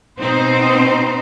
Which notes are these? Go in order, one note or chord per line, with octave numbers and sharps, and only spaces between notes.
B2 C4 D#4 C5